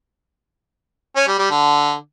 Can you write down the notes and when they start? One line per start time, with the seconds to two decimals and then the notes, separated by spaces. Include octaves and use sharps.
1.16 C#4
1.27 G3
1.39 G3
1.50 D3